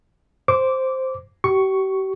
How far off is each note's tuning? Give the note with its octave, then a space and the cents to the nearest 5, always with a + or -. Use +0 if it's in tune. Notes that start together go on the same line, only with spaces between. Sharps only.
C5 +0 D6 -15
G4 -40 C#6 +5